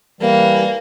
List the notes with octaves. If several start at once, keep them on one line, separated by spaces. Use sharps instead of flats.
E3 G3 A#3